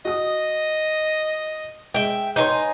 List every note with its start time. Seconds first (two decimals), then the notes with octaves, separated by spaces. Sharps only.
0.05 F#4 D#5 D#6
1.94 G#3 E5 G5
2.36 D#4 B4 C#5 G#5 C6